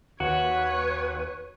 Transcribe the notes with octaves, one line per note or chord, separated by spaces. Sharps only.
D#2 F#4 B4 C#5